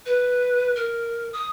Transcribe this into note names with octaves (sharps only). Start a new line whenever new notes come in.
B4
A#4
D#6